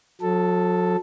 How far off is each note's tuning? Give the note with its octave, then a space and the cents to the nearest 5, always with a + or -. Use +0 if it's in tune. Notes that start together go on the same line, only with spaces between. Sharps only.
F#3 -40 A4 +0